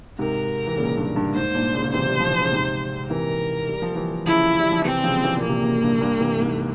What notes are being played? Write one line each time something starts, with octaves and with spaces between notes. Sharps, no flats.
G#2 C3 A#4
E3
A#2 C#3
G2
G2
G#2 C5
G#2
G2 A#2
A#2 C#3
C#3
C3 E3 C5
G3
F3
E3
C#3
G#2 C3
C3 E3 A#4
G3
F3
E3 G3
C#3 F3 E4
G3
F3
C3 E3 C4
G3
C#3 F3
E3 G3
A#2
A#3
C3
A#2 C#3
G2 A#2
G2
C3 E3
G#2 C3